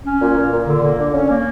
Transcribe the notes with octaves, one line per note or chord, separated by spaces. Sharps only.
C#4
A#2
A#2
A#2
D3
A#3
D3
C#4
A#3